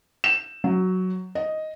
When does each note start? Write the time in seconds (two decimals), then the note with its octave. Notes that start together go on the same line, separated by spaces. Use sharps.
0.24 E7
0.64 F#3
1.35 D#5